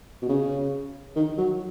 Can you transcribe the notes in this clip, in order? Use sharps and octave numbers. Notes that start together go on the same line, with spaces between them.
B2
C#3
D#3
F#3